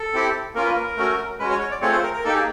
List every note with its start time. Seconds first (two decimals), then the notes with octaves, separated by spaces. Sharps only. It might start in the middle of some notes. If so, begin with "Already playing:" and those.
Already playing: A4
0.14 C4 E4 G4
0.55 A#3 C#4 F4 A#4
0.65 B4
0.75 A#4
0.97 A3 C#4 F#4
1.40 G#3 C#4 F#4 B4
1.50 C#5
1.61 C#5
1.71 D5
1.81 A3 C4 F4 G#4 C#5
1.92 C5
2.03 A#4
2.14 A#4
2.24 A#3 D#4 G4 A4
2.33 G#4